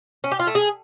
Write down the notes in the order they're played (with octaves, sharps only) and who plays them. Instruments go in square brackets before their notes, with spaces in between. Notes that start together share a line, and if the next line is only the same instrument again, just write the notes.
[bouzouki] C#4
G4
F4
A3
G#4